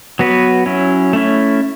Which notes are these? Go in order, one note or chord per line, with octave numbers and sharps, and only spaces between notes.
F#3 B3 F#4 B4
F#3 C#4 E4
A3 C#4 E4